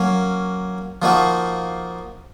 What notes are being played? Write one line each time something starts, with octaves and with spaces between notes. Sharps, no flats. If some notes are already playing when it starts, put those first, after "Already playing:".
Already playing: F#3 A#3 C#4
F3 A#3 D#4 F#4